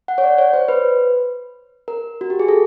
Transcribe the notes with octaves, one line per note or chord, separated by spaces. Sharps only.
F#5
C#5
D5
C#5
C5
B4
A#4
F#4
G4
G#4
A4